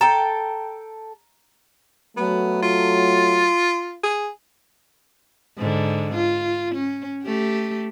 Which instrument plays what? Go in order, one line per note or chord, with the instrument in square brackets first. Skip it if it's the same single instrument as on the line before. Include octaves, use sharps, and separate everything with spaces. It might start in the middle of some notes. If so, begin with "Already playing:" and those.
[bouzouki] A4 G5 [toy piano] A#5
[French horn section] F#3 A3 [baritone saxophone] B3
[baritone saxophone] F4
G#4
[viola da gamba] G#2 D3
F4
C#4
A3 G4